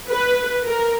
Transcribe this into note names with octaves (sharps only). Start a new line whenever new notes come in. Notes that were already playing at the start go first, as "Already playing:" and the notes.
B4
A#4